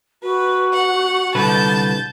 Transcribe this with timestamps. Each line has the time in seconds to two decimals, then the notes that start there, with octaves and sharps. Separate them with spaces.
0.22 F#4 B4
0.72 F#5
1.35 C2 D3 B4 A5 G6